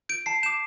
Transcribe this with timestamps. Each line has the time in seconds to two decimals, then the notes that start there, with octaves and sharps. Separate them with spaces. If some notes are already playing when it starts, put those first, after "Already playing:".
0.09 G6 D7
0.26 A5 C7
0.43 D6 G6 E7